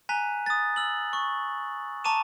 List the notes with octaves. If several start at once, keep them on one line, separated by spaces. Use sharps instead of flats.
G#5 A#5 F#6 B6
D#6 A6
E6 F#7
C#6
A5 A#5 C#6 D6 D#7 E7